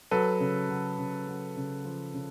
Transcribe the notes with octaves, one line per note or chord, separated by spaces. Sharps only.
F#3 A4 B4
C#3
F#3
C#3
F#3
C#3
F3
C#3